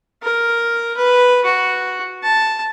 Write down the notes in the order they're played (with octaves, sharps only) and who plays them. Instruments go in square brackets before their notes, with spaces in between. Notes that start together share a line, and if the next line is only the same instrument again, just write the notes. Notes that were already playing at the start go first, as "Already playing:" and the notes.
[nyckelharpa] A#4
B4
F#4
A5